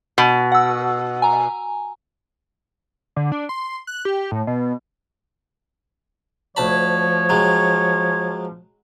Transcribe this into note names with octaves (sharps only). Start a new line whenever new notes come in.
B2
F#5 E6
G#5 A#5
D3
D4
C6
F#6
G4
A2
B2
D2 F3 C#5 A5 B5
F#3 G#3